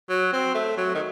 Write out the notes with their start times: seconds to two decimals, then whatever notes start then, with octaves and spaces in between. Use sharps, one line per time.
0.09 F#3
0.33 C4
0.54 A3
0.77 F#3
0.95 D#3